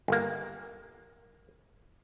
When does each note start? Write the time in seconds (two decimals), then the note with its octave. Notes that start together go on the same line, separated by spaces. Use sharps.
0.08 G1 A#3